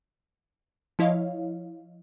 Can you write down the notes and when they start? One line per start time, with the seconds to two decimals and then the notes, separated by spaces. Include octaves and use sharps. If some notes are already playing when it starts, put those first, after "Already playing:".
0.99 F3 E4 C#5 D#5 F5